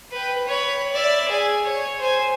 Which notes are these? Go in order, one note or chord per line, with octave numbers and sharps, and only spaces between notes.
B4 G5
C#5 B5
D5 E5
G#4 G#5
C#5
C5 G#5